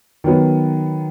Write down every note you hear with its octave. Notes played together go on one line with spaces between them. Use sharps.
D#3 F#3 B3